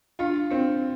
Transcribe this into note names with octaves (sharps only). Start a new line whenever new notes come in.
D4 F4
C4 D4